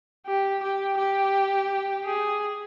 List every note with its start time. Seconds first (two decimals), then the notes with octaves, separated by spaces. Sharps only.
0.27 G4
0.63 G4
0.98 G4
2.05 G#4